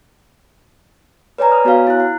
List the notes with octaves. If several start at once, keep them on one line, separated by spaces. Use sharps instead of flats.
B4 C#5 D5 G#5 A#5
D#6 F6
B3 F#4 C#5 F5 G#5
E4 F#6
F#5